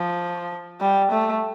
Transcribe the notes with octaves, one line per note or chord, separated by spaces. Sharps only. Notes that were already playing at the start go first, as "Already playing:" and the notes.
Already playing: F3
G3
A3